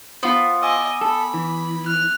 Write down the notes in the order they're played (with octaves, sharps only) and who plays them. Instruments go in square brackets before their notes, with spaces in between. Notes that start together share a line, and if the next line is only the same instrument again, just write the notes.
[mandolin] B3 [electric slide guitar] F4 C5
[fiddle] D#5 [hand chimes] G#5 D6 E6
[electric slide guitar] A4 [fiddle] B5
[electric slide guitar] E3
[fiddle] F6 [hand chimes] F#6